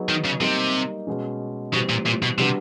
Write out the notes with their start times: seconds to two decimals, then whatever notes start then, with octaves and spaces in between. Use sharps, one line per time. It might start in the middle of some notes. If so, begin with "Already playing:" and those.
Already playing: F#3 B3 D#4 G#4
0.09 D#3
0.25 C#3
0.41 C3 G3 A#3 D#4
1.07 B2 G#3 C#4
1.73 B2 E3 G3 C4
1.89 A#2
2.06 A#2
2.23 B2
2.38 C3 G3 B3 D4 F#4